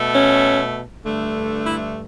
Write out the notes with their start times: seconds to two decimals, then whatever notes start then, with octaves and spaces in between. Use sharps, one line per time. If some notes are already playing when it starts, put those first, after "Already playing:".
Already playing: B2 A3
0.15 C#4
1.06 G2 D3 A3
1.67 E4